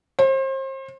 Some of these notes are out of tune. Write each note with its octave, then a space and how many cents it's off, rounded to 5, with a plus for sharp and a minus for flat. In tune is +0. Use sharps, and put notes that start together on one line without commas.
C5 +35